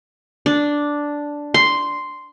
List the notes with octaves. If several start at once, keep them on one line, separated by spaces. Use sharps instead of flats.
D4
C6